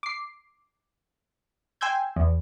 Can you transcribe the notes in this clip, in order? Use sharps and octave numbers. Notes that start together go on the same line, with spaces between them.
D6 C7
G5 G#5 C6 E6 G6 G#6
E2